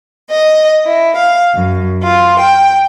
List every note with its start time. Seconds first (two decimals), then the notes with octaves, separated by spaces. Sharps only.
0.30 D#5
0.85 E4
1.16 F5
1.53 F#2
2.03 F4
2.40 G5